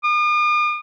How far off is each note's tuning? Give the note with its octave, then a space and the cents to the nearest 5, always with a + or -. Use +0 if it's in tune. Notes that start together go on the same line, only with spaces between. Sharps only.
D#6 -45